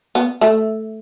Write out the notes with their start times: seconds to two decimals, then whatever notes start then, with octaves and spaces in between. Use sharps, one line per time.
0.15 B3
0.41 A3